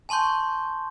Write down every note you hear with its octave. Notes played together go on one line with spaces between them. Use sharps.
G#5 A5 C6 C#6 G6